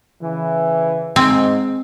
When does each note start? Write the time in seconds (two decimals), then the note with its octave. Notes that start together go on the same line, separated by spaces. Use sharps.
0.21 C#3 E3
1.16 G#2 C4